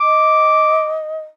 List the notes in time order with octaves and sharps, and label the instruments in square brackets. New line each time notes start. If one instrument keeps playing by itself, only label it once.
[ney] D#5 [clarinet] D6